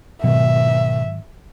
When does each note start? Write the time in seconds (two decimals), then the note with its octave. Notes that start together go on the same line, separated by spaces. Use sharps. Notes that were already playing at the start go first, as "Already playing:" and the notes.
0.24 G#2 B2 D#3 F#3 E5